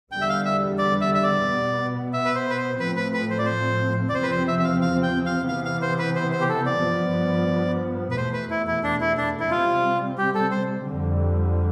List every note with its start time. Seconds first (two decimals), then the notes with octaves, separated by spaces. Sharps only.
0.12 E2 D3 G3 B3 G5
0.21 E5
0.29 F5
0.45 E5
0.78 D5
1.01 E5
1.14 E5
1.23 D5
1.45 B2 B3
2.13 E5
2.25 B4
2.35 C5
2.50 B4
2.58 C5
2.80 A2 F3 A3 C4 B4
2.96 B4
3.14 B4
3.30 C5
3.39 D5
3.45 C5
4.09 D5
4.14 E2 C3 F3 C4 C5
4.23 B4
4.31 C5
4.48 E5
4.59 E5
4.64 F5
4.82 F5
5.03 G5
5.26 F5
5.49 C3 E3 B3 F5
5.65 F5
5.82 C5
5.99 B4
6.15 C5
6.32 C5
6.41 G4
6.49 A4
6.66 D5
6.82 G2 F3 B3
8.11 B4
8.17 E2 B2 A3 C5
8.33 B4
8.50 E4
8.67 E4
8.84 D4
9.01 E4
9.17 D4
9.40 E4
9.51 C3 G3 C4 F4
10.18 G4
10.35 A4
10.51 C5
10.85 F2 D3 G3